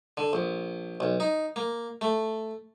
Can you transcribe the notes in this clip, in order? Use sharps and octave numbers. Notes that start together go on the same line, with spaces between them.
D3
A#1
B1
D#4
A#3
A3